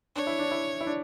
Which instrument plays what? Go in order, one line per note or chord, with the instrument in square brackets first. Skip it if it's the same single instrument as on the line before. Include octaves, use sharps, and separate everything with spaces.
[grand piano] D4 [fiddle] C#5
[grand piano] E4
D4
E4
E4
D4